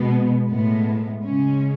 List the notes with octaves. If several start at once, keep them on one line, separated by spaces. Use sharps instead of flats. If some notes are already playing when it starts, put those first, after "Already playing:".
Already playing: B2 G#3 B3
A2 G#3 B3
C#3 G#3 C#4